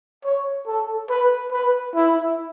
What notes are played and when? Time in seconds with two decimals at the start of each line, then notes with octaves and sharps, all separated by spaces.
0.25 C#5
0.67 A4
1.10 B4
1.52 B4
1.95 E4